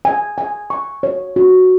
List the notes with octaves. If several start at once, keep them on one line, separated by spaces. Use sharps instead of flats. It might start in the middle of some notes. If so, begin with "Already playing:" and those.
G#5
G#5
C#6
C#5
F#4